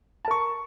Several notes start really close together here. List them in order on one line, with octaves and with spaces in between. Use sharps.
A5 A#4 C#6